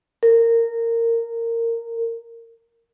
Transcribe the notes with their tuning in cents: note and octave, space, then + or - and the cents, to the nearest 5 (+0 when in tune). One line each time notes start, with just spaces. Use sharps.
A#4 -15